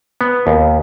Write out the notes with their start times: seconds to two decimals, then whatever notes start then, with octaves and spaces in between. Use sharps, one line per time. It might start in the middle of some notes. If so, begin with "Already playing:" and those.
0.21 B3
0.47 D#2